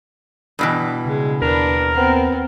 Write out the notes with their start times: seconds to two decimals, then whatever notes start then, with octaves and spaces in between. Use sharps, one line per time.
0.59 G2 B2 E3
1.06 C#3 G#3
1.42 D#2 D4 A#4 B4
1.94 B3 C4